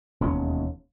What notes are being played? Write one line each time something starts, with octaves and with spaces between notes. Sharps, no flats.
E1 D#2 C#4